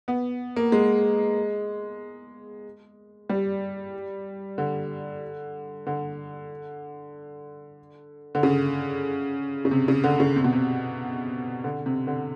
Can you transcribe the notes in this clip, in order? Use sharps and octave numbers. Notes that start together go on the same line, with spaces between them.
B3
A#3
G#3
G3
D3
D3
D3
C#3
C#3
C3
C#3
D3
C#3
C3
B2
C3
D3
C3
D3